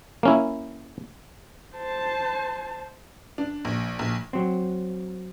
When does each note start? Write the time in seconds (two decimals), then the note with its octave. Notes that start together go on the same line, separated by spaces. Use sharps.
0.23 A#3 C#4 E4
1.77 C5 A5
3.38 D4
3.65 A#1
3.99 A#1
4.33 F#3 C4